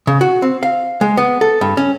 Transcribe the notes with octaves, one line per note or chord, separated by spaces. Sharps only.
C#3
F#4
C4
F5
G#3
B3
A4
G2
C#4